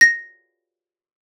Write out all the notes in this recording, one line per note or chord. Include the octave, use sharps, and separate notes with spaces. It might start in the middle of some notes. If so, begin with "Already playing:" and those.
A#6